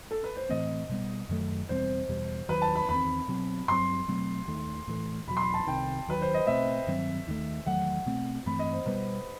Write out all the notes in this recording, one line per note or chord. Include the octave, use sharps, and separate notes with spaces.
A4
B4
C5
A2 E3 A3 C4 D#5
B2 G3 B3
F#2 D#3 F#3 A3
E2 B2 G3 C4 C5
E2 B2 G3
D#2 D#3 F#3 B4
A5
B5
E2 D#3 A3 C4 B5
B2 F#3 C4
G2 F#3 C4 C6
B2 F#3 A3 C4
D#2 D#3 A3
A2 E3 A3
E2 B2 F#3 B5
C6
B5
A5
C2 C3 D#3 G5
D#2 D#3 F#3 B4
C5
D#5
B2 A3 C4 E5
G2 D#3 F#3 C4
D#2 D#3 A3
E2 D#3 F#3 A3 F#5
B2 A3 C4
G2 E3 A3 C4 B5
D#5
C5
B2 G3 B3 B4